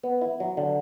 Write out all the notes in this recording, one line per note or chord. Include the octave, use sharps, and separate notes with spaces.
B3
E4
F#3
D3